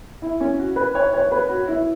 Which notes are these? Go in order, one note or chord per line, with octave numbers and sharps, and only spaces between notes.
E4
C#4
F#4
B4
C#5
C#5
B4
F#4
E4